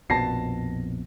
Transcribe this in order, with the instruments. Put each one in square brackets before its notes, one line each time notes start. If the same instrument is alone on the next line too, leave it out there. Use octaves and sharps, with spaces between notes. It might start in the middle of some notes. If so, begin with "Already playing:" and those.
[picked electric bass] A#1 F2 B2 [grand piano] A5 A#6 C7